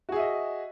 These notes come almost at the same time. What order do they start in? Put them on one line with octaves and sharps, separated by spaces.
F#4 G#4 E5 D#5